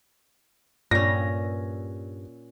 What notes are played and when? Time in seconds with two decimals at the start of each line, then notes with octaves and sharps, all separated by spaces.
0.91 G2 A#2 C#4 A#6